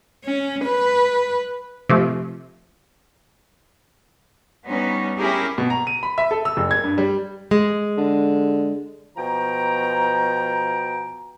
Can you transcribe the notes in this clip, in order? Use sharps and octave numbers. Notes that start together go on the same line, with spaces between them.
C#4
B4
C3 F3 A3
G3 B3 C#4 D#4
C#4 E4 G4 G#4 A#4
B2
A#5
D#7
B5
E5
A4
E6
F#1
G#6
G2
G3
G#3
D3
B2 F3 G5 A#5